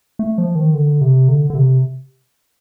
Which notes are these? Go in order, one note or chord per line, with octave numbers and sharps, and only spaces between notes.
A3
F3
D#3
D3
C3
D3
D3
C3